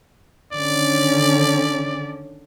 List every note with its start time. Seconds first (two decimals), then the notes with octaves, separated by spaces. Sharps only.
0.53 D3 D#3 C#4 D5